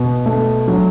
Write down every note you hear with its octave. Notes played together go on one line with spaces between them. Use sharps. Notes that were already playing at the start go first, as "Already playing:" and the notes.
Already playing: B2
A3
F#3